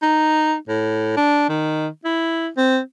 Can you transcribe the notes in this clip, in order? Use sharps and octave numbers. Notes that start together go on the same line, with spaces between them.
D#4
A2
D4
D#3
E4
C4